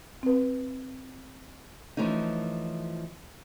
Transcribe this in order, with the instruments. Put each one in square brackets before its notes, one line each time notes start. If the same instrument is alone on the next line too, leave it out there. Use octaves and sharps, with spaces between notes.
[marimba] C4 B4
[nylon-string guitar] E3 F3 A3 C#4 D#4